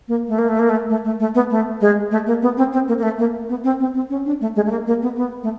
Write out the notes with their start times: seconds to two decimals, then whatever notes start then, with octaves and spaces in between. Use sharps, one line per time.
0.08 A#3
0.28 A3
0.39 A#3
0.48 A3
0.59 A#3
0.69 A3
0.89 A3
1.05 A3
1.20 A3
1.35 B3
1.50 A3
1.81 G#3
2.11 A3
2.26 A#3
2.42 B3
2.57 C4
2.72 C4
2.88 A#3
2.98 A#3
3.03 A3
3.18 A#3
3.49 B3
3.64 C4
3.80 C4
3.94 C4
4.10 C#4
4.25 D4
4.41 A3
4.56 G#3
4.66 A3
4.71 A#3
4.87 A#3
5.02 B3
5.17 B3
5.43 A3